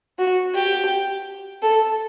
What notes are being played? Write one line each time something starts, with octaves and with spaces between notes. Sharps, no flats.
F#4
G4
A4